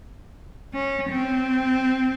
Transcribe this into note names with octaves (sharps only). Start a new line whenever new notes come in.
C#4
C4